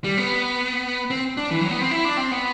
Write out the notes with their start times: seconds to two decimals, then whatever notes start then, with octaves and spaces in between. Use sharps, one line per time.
0.04 G3
0.18 B3
1.10 C4
1.37 D4
1.51 E3
1.61 F#3
1.71 B3
1.81 C4
1.91 E4
2.05 D4
2.17 C4
2.32 B3